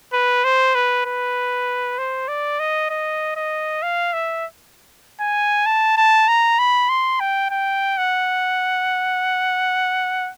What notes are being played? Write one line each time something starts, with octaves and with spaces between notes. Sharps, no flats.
B4
C5
B4
B4
C5
D5
D#5
D#5
D#5
F5
E5
G#5
A5
A5
A#5
B5
C6
G5
G5
F#5